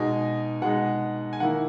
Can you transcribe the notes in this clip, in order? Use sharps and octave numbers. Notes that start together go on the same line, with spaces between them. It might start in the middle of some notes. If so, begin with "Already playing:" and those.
Already playing: B2 G#3 D#4 G#5
B2 G#3 D#4 F#5
G#5
D#3 A#3 E4 F#5